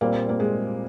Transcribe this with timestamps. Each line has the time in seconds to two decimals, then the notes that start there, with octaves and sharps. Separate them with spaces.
0.01 A#2 G3 A#3 C4
0.29 A#3
0.40 G#3